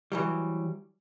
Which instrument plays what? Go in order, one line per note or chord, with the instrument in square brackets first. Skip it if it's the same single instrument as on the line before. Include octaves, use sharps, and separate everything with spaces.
[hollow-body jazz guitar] E3 F#3 G3